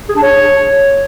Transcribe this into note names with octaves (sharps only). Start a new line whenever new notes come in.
G#4
D4
C#5